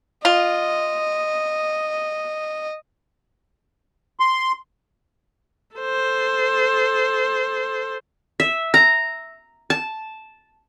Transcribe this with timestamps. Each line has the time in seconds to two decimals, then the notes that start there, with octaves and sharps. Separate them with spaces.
0.25 F4 D#5
4.20 C6
5.76 A4 C5
8.40 E5
8.74 A#5
9.70 A5